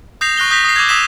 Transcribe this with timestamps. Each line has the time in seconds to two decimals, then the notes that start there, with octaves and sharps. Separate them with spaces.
0.21 D#6 G6 A#6 C7 F7
0.37 C#6 F#6 A#6 G7
0.51 D#6 G6 A#6 B6 F7
0.65 D#6 C7
0.76 D6 E6 G#6
0.89 D#6 E6 B6 E7